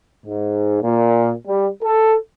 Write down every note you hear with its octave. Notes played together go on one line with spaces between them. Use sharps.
G#2
A#2
G3
A4